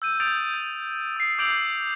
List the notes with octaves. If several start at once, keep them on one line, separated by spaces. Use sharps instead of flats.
E6 G6 D#7
D#6 G6 A6 D7 F7
G6
D#6 C7
D6 E6 G6 D7 F7 F#7